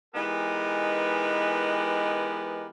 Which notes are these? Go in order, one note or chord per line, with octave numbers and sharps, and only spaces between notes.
E3 G#3 B3 D#4 G4 A#4